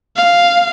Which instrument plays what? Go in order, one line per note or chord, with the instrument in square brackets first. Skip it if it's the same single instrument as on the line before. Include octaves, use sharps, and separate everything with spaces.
[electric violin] F5